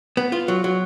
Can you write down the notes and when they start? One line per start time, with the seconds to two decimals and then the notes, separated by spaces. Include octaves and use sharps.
0.17 B3
0.32 F4
0.48 F#3
0.64 F#3